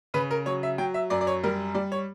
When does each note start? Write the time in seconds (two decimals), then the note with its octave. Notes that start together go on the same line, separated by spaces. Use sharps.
0.14 C#3 B4
0.31 A#4
0.46 F#3 C#5
0.63 E5
0.78 F#3 G5
0.94 E5
1.10 F#2 D5
1.21 D5
1.27 C#5
1.44 G3 A#4
1.74 G3 D5
1.92 C#5